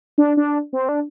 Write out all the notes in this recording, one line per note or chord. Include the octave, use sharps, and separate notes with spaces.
D4
D4
C4
D4